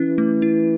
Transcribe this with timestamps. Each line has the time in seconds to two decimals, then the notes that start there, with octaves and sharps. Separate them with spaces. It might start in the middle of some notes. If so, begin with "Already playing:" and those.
Already playing: E3 C#4 E4
0.18 A3
0.42 E4